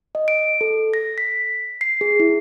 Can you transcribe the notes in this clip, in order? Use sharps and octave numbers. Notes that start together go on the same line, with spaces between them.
D#5
D7
A4
A#6
B6
C7
G#4
E4